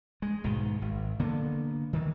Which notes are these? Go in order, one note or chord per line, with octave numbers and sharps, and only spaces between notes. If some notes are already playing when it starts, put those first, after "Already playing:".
G#3
B1 G#2 B2 D#3
G#1
D3 A#3 B3
D#3 E3